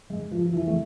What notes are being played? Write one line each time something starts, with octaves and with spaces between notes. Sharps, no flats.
G#3
F3
F3
E3
A3